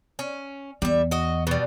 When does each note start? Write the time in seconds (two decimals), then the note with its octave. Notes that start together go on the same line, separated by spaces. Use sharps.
0.19 C#4
0.82 E2 G3 E5
1.11 F#4 D#5
1.47 B2 G3